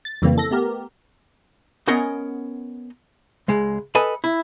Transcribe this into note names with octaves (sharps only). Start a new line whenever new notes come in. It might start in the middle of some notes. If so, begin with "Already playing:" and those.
A6
F2 C#3 E3 G3 A#3 C4
A4 A#6
A3 B3 G4 A#4
B3 C#4 A#4 D#5 F#5 G#5
C#2 G#3
A4 B4 D#5 G#5 B5
E4